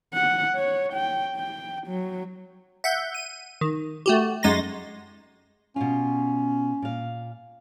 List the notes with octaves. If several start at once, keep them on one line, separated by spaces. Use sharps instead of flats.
F#5
C#5
G5
G5
F#3
E5 F#5 G6
D#7
D#3
A3 F#4 G4
F#2 G#3 D#4 C6 A6 A#6
B2 C#4 F4
A#2 F5